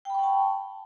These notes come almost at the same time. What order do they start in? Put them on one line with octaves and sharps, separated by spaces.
G5 B5 C#6 F#5 A5